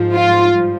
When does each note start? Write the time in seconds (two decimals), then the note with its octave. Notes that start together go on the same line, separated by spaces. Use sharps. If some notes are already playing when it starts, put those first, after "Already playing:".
Already playing: G#2 F3
0.16 F4
0.48 G2 F3